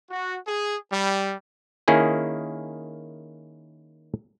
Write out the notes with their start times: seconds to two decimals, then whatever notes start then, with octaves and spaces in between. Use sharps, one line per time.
0.10 F#4
0.48 G#4
0.92 G3
1.88 D#3 A#3 C#4 E4 G#4